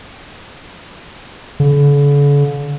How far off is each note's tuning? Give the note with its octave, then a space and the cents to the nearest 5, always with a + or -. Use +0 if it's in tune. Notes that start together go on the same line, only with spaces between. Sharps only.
D3 -45